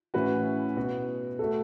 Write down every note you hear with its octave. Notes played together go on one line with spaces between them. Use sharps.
A2 E3 C#4 F#4 B4
B2 B3 F#4
A3 F#4 A4